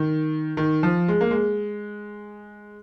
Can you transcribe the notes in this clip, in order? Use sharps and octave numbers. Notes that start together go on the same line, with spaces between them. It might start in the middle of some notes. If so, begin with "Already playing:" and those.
Already playing: D#3
D#3
F3
G#3
A#3
G#3